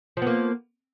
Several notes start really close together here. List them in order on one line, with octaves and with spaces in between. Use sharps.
F3 B3 A#3